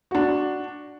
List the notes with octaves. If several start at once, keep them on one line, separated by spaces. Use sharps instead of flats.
D4 F#4